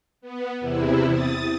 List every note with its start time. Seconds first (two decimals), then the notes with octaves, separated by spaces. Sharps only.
0.21 B3
0.59 E2 C3 E4
1.10 D#6 A6